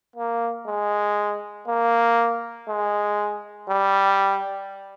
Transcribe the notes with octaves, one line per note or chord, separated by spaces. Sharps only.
A#3
G#3
A#3
G#3
G3